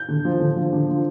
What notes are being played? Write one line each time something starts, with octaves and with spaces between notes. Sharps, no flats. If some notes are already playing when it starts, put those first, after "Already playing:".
Already playing: G6
D3
F3
D3
F3
D3
F3